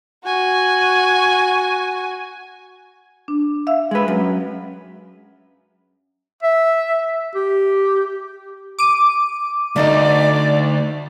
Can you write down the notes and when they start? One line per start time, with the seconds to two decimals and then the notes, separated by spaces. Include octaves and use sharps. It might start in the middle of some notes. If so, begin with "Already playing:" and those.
0.24 F#4 G#5
3.28 D4
3.67 E5 F5 E6
3.91 G#3 B4
4.08 F#2
6.43 E5
7.35 G4
8.79 D6 D#7
9.76 D2 A3 D#4 D5 D#5